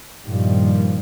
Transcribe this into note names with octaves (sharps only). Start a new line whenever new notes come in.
G2 A#2 D#3 F3 G3